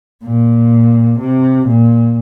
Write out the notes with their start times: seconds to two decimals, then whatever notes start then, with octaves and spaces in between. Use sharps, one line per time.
0.24 A#2
1.20 C3
1.67 A#2